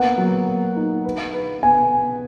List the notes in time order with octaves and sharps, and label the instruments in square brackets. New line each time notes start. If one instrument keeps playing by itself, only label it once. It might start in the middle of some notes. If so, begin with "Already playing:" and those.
Already playing: [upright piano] A#3 B3 [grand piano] F#5
[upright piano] F#3
A#3
D#4
B4
B4
[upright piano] B3 [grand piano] G#5